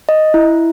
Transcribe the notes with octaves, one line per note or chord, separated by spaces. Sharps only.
D#5
E4